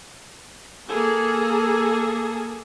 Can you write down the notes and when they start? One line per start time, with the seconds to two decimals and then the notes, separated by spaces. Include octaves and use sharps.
0.89 A#3 G#4 A4